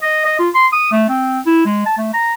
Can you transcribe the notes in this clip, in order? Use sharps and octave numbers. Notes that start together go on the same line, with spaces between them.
D#5
D#5
F4
C6
D#6
A3
C4
E4
G#3
A5
A3
A#5